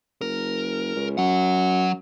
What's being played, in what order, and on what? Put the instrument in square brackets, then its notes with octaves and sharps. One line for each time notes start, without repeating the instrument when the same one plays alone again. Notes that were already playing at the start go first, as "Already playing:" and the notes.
[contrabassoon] F#1 [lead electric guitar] A#4
[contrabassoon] C#2
[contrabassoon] F#2 [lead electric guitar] F#3 F#5